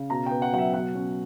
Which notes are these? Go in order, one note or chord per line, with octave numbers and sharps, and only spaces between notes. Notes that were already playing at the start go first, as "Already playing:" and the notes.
Already playing: C#3
B2 A#5
B3 G5
F#5
F#3 F#5
E5
B2 F#5
C#4